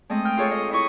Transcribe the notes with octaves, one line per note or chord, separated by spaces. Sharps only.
G#3 A3 C4 D#5
G5 F6
F4 G#4 A4 C#5
D#5
E4 D#5 C#6